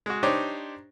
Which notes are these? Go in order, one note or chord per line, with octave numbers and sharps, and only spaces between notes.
G#3 F#4
D4 D#4 G4 C5 C#5